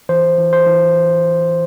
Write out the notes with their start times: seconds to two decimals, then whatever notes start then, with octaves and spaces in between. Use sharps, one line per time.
0.09 E3 C5
0.38 E3
0.53 C5
0.67 E3